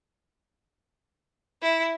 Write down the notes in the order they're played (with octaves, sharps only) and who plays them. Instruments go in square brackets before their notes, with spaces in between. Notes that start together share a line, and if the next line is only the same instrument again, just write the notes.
[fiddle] E4